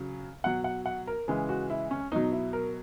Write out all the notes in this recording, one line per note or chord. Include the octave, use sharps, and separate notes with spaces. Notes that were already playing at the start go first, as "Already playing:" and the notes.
Already playing: C#3 F#3
B2 F#3 F#5
F#5
F#5
A#4
C#3 E3 G#3
F#4
E4
C#4
B2 F#3 D#4
E4
A#4